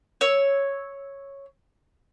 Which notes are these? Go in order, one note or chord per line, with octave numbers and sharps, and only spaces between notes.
C#5 E6